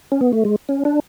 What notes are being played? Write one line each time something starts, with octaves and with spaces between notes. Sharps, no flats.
C#4
B3
A3
G#3
C#4
D4